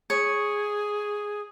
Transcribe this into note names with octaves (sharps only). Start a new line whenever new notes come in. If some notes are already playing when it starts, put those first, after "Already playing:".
G#4 C#5